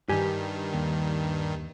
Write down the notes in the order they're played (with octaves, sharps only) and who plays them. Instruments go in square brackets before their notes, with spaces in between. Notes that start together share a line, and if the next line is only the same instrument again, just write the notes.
[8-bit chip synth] G2 D#3 [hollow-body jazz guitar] G4 G#5
[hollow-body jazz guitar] D#2